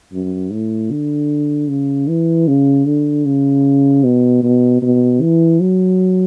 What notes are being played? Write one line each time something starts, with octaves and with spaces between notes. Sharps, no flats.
F#2
A2
D3
C#3
E3
C#3
D3
C#3
B2
B2
B2
E3
F#3